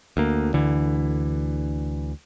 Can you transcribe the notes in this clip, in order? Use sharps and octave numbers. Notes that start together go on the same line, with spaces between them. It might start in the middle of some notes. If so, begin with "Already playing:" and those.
D2 A#3
D2 D3 E3